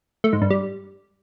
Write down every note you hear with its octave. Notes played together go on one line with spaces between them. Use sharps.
A3
G#2
G2
G3